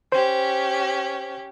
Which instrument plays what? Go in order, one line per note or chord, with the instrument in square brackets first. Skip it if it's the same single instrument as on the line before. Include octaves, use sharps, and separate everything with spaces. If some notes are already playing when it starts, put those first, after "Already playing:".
[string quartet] C#4 G4 [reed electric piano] C5